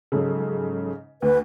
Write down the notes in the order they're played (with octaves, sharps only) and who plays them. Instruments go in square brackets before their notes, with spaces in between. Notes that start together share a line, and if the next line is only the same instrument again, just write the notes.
[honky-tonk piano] G#2 C#3 [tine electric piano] F#3 G#4 A4
[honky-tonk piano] D2 [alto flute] B4